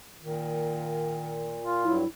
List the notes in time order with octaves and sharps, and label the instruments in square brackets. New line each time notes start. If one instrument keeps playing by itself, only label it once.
[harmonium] A#2 [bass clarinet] D#3
[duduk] F4
[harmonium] G2 F#3 [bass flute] E4